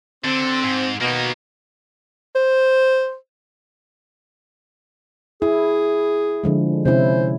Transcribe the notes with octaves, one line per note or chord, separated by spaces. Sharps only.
D3 C4
G#2
B2 A#3 D#4
C5
E4 G#4
D3 F3 G#3
C3 C#4 E4 C5